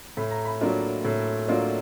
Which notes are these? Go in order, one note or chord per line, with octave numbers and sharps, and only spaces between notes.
A2 B5
A#5
B5
F#3 A#3 D4 F4
A2
F#3 A#3 D4 F4